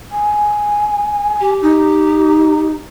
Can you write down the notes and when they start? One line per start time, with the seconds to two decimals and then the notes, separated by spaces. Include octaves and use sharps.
0.11 G#5
1.41 G4
1.62 D#4